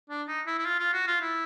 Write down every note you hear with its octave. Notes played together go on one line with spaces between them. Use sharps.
D4
D#4
E4
E4
F4
F4
F#4
F4
E4